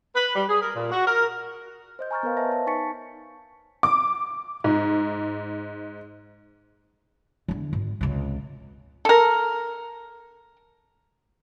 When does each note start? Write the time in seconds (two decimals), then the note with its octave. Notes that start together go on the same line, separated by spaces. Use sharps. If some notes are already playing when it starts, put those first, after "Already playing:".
0.16 B4
0.36 G3
0.49 G#4
0.61 A#4
0.75 A#2
0.91 F#4
1.06 A#4
1.99 C5 D#5 G6
2.11 G#5 A#5 C#6 F6 G6 A6
2.23 B3 A#4 B4 F5
2.37 B4 C5 D#5 E5 A5 A#6
2.49 C#5 A5
2.67 D#4 G#5 C#6 A6 B6 C#7
3.83 D6
4.64 G#2
7.48 E2 D3
7.73 G#1
8.01 C#2 C3
9.05 A4 A#4